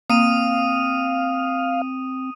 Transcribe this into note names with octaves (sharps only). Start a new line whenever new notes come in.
A#3 C4 F5 D#6 D#7